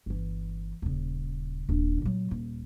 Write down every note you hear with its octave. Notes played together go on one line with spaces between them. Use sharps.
G1 E3
D#1 C#3
D#1 D4
A#2 F#3
D#1